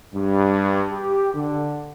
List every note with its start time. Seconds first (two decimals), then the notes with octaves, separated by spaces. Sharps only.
0.14 G2
0.92 G4
1.35 D3